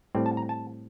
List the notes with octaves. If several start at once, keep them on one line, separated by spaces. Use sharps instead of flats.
A2 G3 C4
A5
A#5
A5